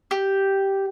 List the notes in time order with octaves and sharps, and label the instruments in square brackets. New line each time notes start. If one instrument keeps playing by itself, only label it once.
[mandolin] G4